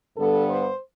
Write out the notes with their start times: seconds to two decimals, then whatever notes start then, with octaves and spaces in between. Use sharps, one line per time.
0.17 G2 D3 G3 B3 A4
0.49 C5